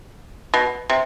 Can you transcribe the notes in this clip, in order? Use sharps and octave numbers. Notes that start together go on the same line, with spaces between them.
B2
C3